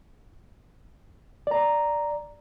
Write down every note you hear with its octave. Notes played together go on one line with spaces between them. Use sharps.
D5 A#5